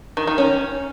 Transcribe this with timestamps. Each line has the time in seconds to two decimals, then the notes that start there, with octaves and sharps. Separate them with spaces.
0.17 D#3
0.27 D#3
0.38 C#4